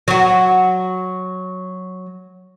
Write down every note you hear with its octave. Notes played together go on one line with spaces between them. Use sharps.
F#3 F#4